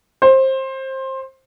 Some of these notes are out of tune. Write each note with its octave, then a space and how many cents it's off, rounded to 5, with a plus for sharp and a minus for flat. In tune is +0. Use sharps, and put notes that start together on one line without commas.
C5 +20